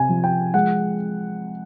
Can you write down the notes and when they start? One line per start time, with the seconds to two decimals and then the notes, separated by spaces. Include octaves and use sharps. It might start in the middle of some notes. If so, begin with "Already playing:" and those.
Already playing: C3 G#5
0.09 F3
0.24 G5
0.54 G#3 F#5